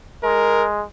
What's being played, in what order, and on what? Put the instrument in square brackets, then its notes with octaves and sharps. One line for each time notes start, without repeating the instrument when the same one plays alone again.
[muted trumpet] G#3 [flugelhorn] A#4